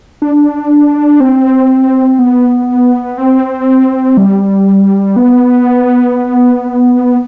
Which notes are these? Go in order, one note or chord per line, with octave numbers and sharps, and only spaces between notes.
D4
C4
B3
C4
G3
B3